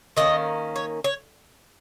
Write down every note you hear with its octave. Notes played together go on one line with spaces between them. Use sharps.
D#3 A#3 C#4 D#5
C#5
C#5